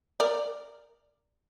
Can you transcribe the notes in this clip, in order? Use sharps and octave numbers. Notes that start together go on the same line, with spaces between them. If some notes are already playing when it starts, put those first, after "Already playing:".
A#4 D5